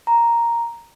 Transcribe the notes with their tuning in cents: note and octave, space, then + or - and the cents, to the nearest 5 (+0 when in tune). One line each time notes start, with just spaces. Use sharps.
A#5 +0